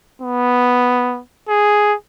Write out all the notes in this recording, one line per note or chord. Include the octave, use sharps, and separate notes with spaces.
B3
G#4